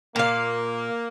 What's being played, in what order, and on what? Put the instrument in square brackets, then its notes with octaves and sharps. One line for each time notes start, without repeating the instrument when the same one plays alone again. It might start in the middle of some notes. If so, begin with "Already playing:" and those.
[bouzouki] A#2 F5 [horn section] A#3